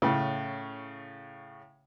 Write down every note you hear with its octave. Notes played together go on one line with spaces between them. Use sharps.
A2 C#3